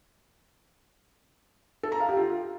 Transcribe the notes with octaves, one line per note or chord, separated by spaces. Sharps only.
A4
A#5
F5
G4
F4